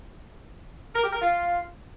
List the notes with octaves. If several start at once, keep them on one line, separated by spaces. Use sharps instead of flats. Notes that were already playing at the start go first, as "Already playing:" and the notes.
A#4
G4
A#4
F4